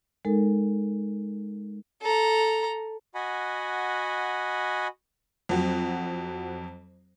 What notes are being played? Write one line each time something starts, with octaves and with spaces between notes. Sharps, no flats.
G#3 D#4 A4 A#4
A4 A#5
F#4 D#5 F#5 G#5 B5
F2 F#3 C4